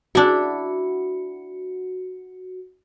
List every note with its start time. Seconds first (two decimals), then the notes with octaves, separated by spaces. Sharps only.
0.15 D4 E4 F#4